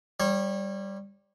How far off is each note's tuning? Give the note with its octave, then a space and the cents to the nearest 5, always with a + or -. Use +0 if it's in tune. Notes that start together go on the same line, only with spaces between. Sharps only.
G3 +0 C#5 -30